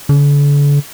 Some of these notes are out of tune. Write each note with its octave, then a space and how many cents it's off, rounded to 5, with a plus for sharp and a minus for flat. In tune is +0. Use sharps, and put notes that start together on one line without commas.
D3 -40